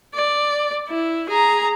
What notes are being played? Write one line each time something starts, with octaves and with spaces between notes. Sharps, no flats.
D5
E4
G#4 A#5